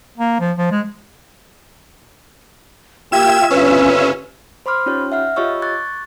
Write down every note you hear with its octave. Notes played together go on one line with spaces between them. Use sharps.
A#3
F3
F3
G#3
A#3 F4 G4 E5 G5 G#6 E7
G1 C2 C#3 C#4 B4
C5 B5 C6 D6 F6
C#4 D#4 F4 G4 C#5
E5 F#5 F6
F4 G4 C#5 D#5 C#6 E6
C#6 D6 F#6 G#6 A6